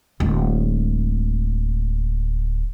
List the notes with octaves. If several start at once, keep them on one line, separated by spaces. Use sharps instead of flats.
D1 G#3